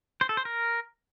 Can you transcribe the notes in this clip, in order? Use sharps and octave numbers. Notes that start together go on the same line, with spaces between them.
C5
A4
C5
A#4